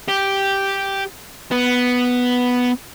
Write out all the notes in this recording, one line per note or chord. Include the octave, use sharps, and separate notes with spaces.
G4
B3